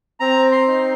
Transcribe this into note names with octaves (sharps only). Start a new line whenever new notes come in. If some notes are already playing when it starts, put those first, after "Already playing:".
C4 A#5
C6
D#4